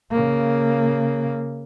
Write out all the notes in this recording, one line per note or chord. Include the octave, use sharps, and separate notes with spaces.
C#3 A#3